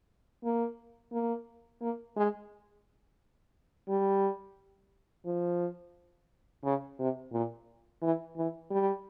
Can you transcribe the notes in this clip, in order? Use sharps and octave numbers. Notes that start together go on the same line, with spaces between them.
A#3
A#3
A#3
G#3
G3
F3
C#3
C3
A#2
E3
E3
G3